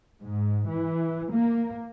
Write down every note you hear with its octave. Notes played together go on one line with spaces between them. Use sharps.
G#2
E3
A#3